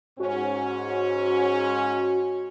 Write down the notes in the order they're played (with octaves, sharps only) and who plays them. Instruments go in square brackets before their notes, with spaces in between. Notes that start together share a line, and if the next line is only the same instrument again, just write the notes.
[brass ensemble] G#2 C#4 [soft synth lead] F#4